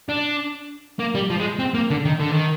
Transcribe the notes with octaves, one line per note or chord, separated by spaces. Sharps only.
D4
A#3
G3
F3
G#3
C4
A#3
D3
D#3
D3
D#3